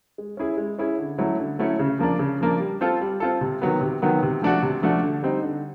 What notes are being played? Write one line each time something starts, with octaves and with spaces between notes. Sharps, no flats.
G#3
C#4 E4 G#4
G#3
C#4 E4 G#4
D3
F#3 A3 C#4 E4
D3
F#3 A3 C#4 E4
C#3
F3 A#3 D4
C#3
F3 A#3 D4
G3
C4 F4 A4
G3
C4 F4 A4
C3
D#3 F#3 B3
C3
D#3 F#3 B3
C3
F3 A3 D4 F#4
C3
F3 A3 D4 F#4
D3
G3 C4 D#4
D3